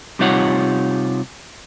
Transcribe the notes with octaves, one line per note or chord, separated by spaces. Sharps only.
C3 G3 D#4 F4 C#5 F#5